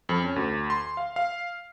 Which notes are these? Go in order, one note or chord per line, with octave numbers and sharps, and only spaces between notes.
F2
C#4
D2
C6
F5
F5